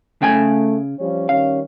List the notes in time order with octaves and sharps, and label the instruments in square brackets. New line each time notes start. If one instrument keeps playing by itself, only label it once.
[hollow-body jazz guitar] C#3 G5 G#5 [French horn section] A3
[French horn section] F3 G3 C#4
[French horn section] D#3 G3 C#4 [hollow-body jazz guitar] F5